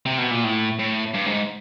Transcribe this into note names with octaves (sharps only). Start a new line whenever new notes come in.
C3
B2
A#2
A2
A2
G2
G#2